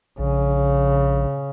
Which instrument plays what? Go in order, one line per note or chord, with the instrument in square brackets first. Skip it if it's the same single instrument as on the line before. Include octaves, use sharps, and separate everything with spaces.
[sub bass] A#1 [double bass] C#3